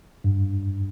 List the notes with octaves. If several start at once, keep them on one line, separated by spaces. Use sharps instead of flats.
G2